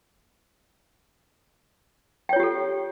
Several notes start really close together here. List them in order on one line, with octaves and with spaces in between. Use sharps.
G5 C#5 F4 G4 A4